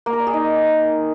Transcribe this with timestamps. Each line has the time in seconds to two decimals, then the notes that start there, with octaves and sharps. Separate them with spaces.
0.06 A#3
0.13 A#4
0.20 D5
0.27 G#4
0.34 D#4